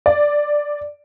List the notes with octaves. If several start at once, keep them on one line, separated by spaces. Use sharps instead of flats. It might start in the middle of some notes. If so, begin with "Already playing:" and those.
D5